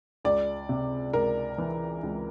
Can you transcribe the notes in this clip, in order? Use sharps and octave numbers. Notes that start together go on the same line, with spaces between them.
C#2 D5
C3
C#2 A#4
E3
C#2